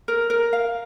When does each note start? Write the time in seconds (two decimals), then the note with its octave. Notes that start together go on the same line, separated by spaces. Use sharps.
0.08 A#4
0.30 A#4
0.53 F5